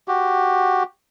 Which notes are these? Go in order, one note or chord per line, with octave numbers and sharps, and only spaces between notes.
F#4 G4